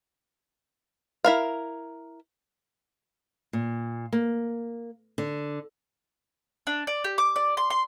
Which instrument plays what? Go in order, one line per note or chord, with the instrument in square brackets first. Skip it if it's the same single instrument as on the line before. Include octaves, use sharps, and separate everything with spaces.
[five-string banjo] E4 A#4 F5
[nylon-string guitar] A#2
A#3
D3
[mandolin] D4
D5
G4
D6
D5
C6
C6